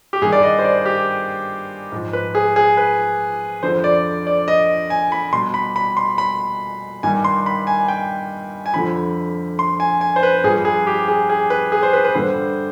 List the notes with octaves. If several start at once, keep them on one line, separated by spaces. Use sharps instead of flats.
G4
G2 D#3 G3 G#4
D5
D#5
C5
D5
G4
G#2 F3
B4
G#4
G#4
B4
F2 D3 F3 C5
D5
D5
D#5
G#5
B5
B2 G3 C6
B5
B5
C6
B5
G2 D#3 G3 G#5
C6
B5
G#5
G5
G#5
F2 D3 F3 B5
C6
G#5
G#5
C5
B4
G2 F3 G#4
G#4
G4
G#4
G#4
B4
G#4
C5
B4
B4
G2 D3 G3 C5